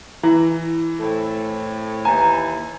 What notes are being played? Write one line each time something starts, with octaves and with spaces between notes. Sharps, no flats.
E3 E4
A2 C4 A4
D#2 E3 B4 G#5 A#5